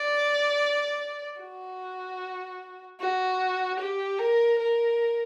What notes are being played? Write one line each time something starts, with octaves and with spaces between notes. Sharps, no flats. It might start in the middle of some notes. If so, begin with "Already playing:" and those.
Already playing: D5
F#4
F#4
G4
A#4
A#4